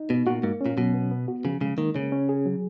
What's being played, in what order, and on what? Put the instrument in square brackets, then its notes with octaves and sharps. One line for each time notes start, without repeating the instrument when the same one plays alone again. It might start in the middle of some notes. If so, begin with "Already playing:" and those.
Already playing: [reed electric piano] D#4
[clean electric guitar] B2 [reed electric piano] B3
[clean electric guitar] A#2 [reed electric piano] F#4
[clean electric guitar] G#2 [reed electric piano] A#3
[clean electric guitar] A#2 [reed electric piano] C#4
[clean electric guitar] B2 [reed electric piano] F#3
[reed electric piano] B3
B3
F#4
[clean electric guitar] C#3 [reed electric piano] F3
[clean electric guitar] C#3 [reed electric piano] G#3
[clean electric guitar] D#3 [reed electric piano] A#3
[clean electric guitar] C#3 [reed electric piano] C#4
[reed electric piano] C#4
G#4
F#3